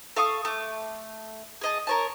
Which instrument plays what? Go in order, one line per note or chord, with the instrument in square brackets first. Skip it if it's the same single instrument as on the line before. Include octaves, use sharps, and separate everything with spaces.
[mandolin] A4 F5 C#6 D#6
A3 D6
G#4 D#5 A5
A#4 C#5 A5